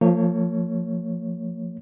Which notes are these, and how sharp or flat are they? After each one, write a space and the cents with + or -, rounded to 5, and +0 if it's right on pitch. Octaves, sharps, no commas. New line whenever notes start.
F3 +0 A#3 -45 C#5 +0